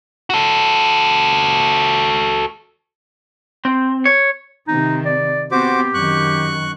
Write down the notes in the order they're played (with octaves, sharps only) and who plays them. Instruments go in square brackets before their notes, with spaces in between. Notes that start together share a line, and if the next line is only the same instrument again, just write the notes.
[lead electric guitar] F#4 A4
C4
C#5
[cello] C3 D#3 [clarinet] D#4
[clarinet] D5
[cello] B3 C4 [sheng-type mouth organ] F#4 C5 D6 [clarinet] G4
[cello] F#2 D#3 [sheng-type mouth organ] C#6 F#6